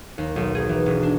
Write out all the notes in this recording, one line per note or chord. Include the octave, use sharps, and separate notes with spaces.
D#2
B1
G#4
E3
E1
D4